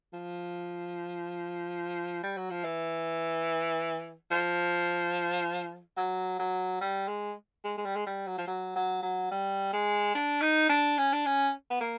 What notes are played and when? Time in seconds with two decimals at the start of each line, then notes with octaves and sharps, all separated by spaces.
0.13 F3
2.23 G3
2.37 F#3
2.50 F3
2.64 E3
4.31 F3
5.97 F#3
6.39 F#3
6.81 G3
7.08 G#3
7.64 G#3
7.77 G#3
7.85 G3
7.96 G#3
8.06 G3
8.27 F#3
8.38 F3
8.47 F#3
8.76 F#3
9.02 F#3
9.31 G3
9.73 G#3
10.15 D4
10.41 D#4
10.70 D4
10.98 C#4
11.13 D4
11.26 C#4
11.70 B3
11.81 A#3